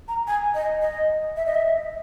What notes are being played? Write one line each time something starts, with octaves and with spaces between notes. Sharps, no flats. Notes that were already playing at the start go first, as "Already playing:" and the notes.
A#5
G#5
D#5
D#5
E5
D#5
E5